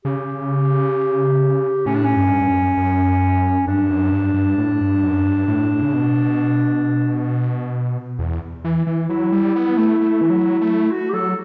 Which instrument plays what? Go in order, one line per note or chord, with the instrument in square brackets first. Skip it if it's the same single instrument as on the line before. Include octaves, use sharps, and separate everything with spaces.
[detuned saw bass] C#3 [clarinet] G4
[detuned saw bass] A2 [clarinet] C#4
[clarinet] D4
C#4
[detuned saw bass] G2
G2
F#2
F#2
[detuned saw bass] G2 [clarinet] D4
[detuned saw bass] F#2
G2
G2
A2
G2
F#2
G2
A2
C#3
B2
E2
E3
E3
[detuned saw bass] F#3 [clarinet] E4
[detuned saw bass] G3
B3
A3
A3
E3
F#3
A3
[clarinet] F#4
G4
[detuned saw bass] F#3 [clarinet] A4